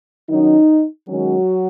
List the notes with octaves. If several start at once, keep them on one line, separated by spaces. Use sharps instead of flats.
D#3 F#3 C#4 D#4
D#3 F#3 G#3 C#4 F#4